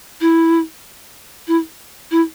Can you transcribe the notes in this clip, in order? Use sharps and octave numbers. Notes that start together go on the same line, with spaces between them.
E4
E4
E4